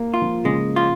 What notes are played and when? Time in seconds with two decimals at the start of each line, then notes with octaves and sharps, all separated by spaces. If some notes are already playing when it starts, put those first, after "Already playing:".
Already playing: A#3
0.14 F4
0.22 F3
0.45 C#3 G#3
0.76 F4